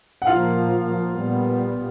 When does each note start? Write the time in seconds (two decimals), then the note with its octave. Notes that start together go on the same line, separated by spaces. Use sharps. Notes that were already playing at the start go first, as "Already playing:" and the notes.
0.22 F#5
0.27 A#2 F3 A#3 F4 F5
1.13 A#2 G3 B3